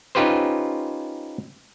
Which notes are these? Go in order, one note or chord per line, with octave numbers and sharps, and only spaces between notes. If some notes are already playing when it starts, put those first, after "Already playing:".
C#4 D#4 F4 G4 B4 C5